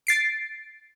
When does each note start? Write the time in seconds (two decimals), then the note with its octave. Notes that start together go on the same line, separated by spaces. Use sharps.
0.07 A6 C7 D7